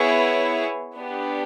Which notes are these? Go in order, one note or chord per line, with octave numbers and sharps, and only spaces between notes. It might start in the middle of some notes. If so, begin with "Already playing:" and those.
Already playing: B3 E4 G#4 C#5
B3 D4 G4